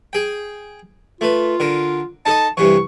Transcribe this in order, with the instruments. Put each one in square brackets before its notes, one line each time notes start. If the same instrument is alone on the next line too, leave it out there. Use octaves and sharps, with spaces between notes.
[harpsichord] G#4 G5
[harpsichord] A3 B4 [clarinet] F4
[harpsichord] D3 A#4
[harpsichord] D#4 A4 D#5 [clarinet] A5
[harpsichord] G2 C3 E3 [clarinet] C#6